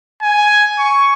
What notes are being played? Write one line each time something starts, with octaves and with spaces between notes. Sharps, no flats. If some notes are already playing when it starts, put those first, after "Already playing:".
G#5
C#6